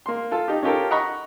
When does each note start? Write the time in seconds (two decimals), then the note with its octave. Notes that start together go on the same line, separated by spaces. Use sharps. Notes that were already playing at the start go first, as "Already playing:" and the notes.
0.06 A#3 C6
0.31 F4 A4
0.48 D#4 G4
0.63 C#4 D#4 F4 G4 A4 A#4
0.91 D#5 F#5 A#5 B5 C#6